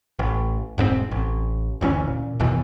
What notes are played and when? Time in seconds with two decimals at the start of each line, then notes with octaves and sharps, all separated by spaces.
0.19 A1
0.78 E1 G#2 G3 C4
1.11 A1
1.81 F#1 D2 E3 C#4
2.07 A#2
2.40 F#1 D#2 B2 E3